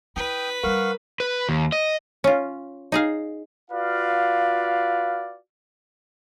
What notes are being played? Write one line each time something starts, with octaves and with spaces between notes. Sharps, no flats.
E4 B4 G5 D#6
G3 D4 A#4 F5 F#5 C#6
B4
D#2
D#5
C#4 F4
D#4 G#4 F5
F4 F#4 B4 D5 F5